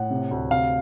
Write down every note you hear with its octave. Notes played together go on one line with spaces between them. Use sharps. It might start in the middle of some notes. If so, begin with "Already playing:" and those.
Already playing: A2 F#5
C3
D2
C3 F5